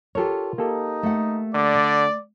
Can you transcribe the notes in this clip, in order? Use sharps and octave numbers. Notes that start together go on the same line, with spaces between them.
F4 G4 A4 A#4 C#5
A#3 D#4 G4 A4
A3 F#5
D3 D5